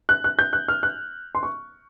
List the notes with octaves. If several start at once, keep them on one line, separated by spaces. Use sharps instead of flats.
F#6
F#6
G6
F#6
F6
F#6
C6
C#6